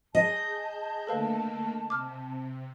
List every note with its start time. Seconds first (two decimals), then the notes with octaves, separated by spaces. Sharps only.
0.15 G#4 D#5 A5 G6
1.07 D3 A3 A#3 A4 B4 F5
1.90 C3 D6 F6